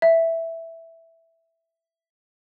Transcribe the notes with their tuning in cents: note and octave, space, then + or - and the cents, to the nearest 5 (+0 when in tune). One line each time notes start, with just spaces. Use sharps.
E5 +0